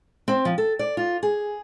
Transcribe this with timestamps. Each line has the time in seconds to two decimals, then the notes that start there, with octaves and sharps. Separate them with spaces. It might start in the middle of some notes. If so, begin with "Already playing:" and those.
0.28 C4
0.45 F3
0.58 A4
0.79 D5
0.97 F4
1.23 G#4